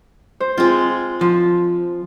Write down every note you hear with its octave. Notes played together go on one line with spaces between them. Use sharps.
C5
G#3 C4 F4
F3